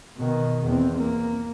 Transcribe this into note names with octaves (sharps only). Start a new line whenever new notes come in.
B2 D#3
E2 C4
A#3